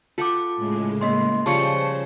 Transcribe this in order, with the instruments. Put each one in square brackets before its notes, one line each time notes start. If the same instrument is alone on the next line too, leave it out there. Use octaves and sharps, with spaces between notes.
[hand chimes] F4 D6 [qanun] A4 F#5 G5
[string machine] A2 C#3 G#3
[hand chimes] A#3 D#5 C6
[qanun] C#3 F3 G3 [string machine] C5 [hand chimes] A5 C#6 C#7